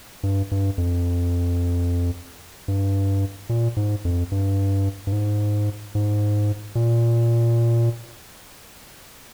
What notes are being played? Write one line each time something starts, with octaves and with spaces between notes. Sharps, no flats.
G2
G2
F2
G2
A#2
G#2
F2
G2
G2
G#2
G#2
A#2